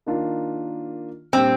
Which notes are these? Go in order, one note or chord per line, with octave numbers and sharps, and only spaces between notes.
D#3 A#3 D4 F4 A#4
A#2 G3 C4 D4 G4